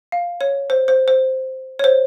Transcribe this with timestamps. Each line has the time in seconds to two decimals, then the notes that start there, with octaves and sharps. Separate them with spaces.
0.12 F5
0.41 C#5
0.70 C5
0.88 C5
1.08 C5
1.79 C#5
1.84 C5